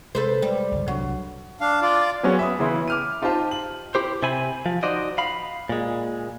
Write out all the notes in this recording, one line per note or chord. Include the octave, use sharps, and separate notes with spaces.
C3 G#3 A4 B4 C5
G3 G#3
G1 C#2
C2 F#3 C4 D4
D4 F5
F4 D5
F#3 B3 C#4 F#4 G#4
E5 B5 D#6
C#3 E3 B3 E4 C6
D6 F6 D#7
D#4 F4 G4 C5 A5 C6
F#7
E4 G4 C5
C3 C4 G#5 B5
F3
D#4 F#4 C5 D5 D#5
F5 B5
A#2 G#3